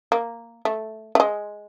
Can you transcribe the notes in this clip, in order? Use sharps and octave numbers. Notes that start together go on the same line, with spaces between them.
A#3
A3
A3
G#3